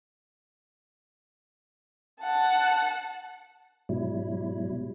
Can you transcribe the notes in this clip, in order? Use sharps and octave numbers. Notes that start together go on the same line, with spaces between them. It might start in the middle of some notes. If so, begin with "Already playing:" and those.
F#5 A5
G#2 B2 F#3 G3 E4